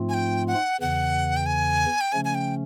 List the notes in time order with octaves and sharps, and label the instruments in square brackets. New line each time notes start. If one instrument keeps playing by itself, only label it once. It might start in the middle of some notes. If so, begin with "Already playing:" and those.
Already playing: [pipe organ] G#2 F3 A3 C4 F4
[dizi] G#5
G5
F#5
[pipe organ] E2 C#3 E3 [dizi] F#5
[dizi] G5
G#5
G5
[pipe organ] C#3 F3 A3 C#4 [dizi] G#5
[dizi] G#5
G5